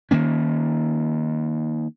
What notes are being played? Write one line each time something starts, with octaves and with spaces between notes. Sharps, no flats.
D#3 A#3 C#4